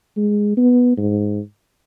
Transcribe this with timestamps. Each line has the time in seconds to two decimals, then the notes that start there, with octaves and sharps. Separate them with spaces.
0.17 G#3
0.57 B3
0.97 G#2